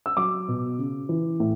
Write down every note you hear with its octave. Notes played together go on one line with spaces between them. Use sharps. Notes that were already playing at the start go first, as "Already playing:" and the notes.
E6
F#3 D6
B2
C#3
E3
A2